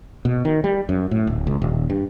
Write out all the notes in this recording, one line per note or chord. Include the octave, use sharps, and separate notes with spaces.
B2
D#3
G3
F#2
A2
D1
C#2
D#1
G2